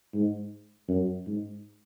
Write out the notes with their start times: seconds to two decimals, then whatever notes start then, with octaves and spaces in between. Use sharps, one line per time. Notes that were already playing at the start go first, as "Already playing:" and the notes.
0.13 G#2
0.88 F#2
1.26 G#2